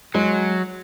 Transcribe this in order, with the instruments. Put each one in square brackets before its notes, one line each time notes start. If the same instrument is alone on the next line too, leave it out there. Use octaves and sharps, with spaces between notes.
[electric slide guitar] F#3 [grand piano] G#3